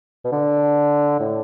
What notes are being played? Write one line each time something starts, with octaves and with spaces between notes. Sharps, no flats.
B2
D3
A2